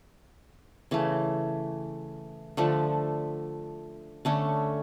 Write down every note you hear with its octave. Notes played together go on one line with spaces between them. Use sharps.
C#3 E3 A3
D3 F3 A3
D3 A3 C#4